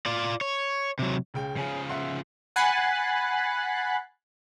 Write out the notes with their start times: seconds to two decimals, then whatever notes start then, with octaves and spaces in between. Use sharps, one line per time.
0.06 F4 D5
0.41 C#5
0.99 C3 F#3
1.34 C#2 C#3 G5
1.57 C#3 F3 C#4 G#4
1.89 E5 F#5 C6
2.56 F#5 G#5 B5 F#6 A6 C7